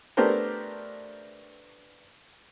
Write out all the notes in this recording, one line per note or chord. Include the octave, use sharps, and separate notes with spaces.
A3 B3 D4 G4 A#4 C5